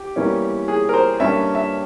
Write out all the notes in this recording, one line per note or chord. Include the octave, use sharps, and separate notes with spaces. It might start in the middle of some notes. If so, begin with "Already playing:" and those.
Already playing: G4
E2 E3 G3 A#3 C#4
G#4
A#4
C5
G2 G3 A#3 C#4 E5
E5